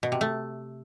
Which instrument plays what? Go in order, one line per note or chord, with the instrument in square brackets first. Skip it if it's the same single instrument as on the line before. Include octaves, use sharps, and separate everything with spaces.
[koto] B2
C3
A3